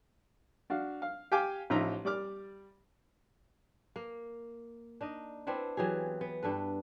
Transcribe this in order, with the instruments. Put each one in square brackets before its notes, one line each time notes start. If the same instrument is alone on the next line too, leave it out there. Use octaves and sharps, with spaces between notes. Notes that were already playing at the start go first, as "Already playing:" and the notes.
[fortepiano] D4 F#4 F5
F5
G4 F5 G5 G#5 D6
A1 F3 D#4 E5 A#5
G3 D5 D6 F6
[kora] A#3
D4 D#4 D#5
B3 C4 D4 E4
E3 F#3 G4 G#4
B3
G2 D4 A4 B4